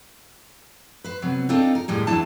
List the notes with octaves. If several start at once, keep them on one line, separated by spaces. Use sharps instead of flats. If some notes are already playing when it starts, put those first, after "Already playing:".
B4 C5
C3 F#3 B3
C4 D4 D#4 F4 A4
A#4
D#2 A2 G3 G#3
E2 F#3 G#3 D4 E4 A5